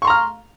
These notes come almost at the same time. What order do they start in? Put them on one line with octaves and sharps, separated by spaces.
C#6 C6 A#5 F6